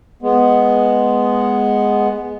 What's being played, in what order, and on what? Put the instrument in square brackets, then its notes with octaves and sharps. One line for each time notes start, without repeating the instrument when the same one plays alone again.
[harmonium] G#3 B3